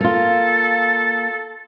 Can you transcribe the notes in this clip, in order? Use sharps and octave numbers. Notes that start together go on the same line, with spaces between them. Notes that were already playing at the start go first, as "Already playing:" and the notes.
A#3 F4 A4